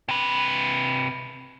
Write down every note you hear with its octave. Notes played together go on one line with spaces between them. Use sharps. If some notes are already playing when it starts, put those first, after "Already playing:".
C3 B4